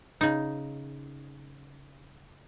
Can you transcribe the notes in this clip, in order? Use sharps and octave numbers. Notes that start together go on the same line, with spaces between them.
C#3 D#4